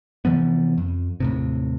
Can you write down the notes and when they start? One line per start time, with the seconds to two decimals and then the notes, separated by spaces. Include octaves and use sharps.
0.25 C3 E3 F3 B3
0.78 F2
1.20 D#2 A2 C3